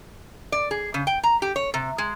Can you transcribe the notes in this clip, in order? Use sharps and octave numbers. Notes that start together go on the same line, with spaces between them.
D5
G#4
C#3
G5
A#5
G4
C#5
C3
G#3